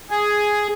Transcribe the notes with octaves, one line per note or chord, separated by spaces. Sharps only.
G#4